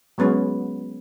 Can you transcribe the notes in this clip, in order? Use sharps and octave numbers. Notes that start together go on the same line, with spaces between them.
F#3 G#3 B3 C#4